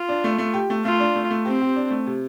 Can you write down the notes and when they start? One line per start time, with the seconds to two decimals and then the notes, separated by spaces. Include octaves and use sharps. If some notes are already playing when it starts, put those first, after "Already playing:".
Already playing: F4
0.09 D4
0.24 A3
0.38 A3
0.54 G4
0.70 A3
0.84 A3 F4
1.00 D4
1.16 A3
1.31 A3
1.45 C4 G4
1.61 G4
1.76 D4
1.91 A3
2.07 C3